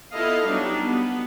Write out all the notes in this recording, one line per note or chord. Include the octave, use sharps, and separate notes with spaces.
B3 E4 F4 A4 D#5 F5
F#3 G3 B3 D4 D#4
B3